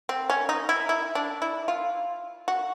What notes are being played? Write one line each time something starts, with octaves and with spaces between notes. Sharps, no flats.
C4
C#4
D#4
E4
E4
D4
E4
F4
F#4